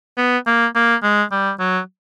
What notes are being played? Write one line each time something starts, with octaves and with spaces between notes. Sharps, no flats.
B3
A#3
A#3
G#3
G3
F#3